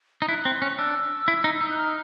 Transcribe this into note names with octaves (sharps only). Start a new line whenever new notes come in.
D#4
E4 F#6
C4
C#4
D4 E6
E4
D#4
D#4
F#6
F6